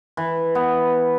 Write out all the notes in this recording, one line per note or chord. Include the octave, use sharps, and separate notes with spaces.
E3
B3